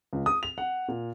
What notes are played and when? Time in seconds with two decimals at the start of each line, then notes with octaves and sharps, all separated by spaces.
0.13 C#2
0.26 D#6
0.43 F7
0.58 F#5
0.88 A#2